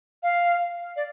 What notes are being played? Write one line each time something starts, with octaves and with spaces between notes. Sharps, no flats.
F5
D5